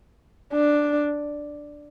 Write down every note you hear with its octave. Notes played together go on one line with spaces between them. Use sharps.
D4